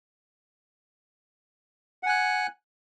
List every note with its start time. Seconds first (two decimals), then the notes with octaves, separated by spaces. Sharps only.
2.03 F#5
2.06 G#5
2.09 F#6